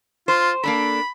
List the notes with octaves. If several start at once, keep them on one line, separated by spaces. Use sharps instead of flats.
F4 C5
A#3 D4 A4 B5